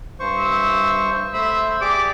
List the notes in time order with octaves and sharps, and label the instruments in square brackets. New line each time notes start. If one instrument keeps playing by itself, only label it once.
[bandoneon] G2 C5 C#6
[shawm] E5
[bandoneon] A3 C5 B5 [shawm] E5
[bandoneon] G4 G#4 D5 [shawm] D6